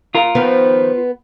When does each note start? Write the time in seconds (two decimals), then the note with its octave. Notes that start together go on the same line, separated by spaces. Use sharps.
0.15 F4 A#4
0.35 D#3 F3 B3 B4